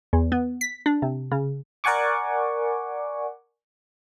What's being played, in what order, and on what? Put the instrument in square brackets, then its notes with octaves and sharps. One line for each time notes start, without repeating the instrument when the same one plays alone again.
[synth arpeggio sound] E2
B3
B6
D4
C3
C#3
[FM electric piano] A#4 D5 F#5 G#5 C#6 D6